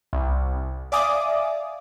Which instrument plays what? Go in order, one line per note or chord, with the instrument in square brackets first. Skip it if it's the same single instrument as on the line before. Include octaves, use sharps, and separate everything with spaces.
[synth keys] C2
D5 E5 F5 G#5 D6 D#6